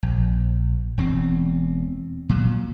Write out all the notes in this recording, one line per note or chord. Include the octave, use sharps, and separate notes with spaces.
A#1
E1 E2 C4
A#2 F#3